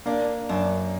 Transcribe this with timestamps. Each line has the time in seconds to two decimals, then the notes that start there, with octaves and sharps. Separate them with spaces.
0.06 A#3 D4
0.49 F#2 D4